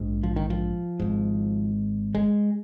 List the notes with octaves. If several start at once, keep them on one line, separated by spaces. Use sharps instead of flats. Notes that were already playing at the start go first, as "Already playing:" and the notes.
Already playing: A#1 G#2
F3
D#3
F3
G#1 G#2
G#3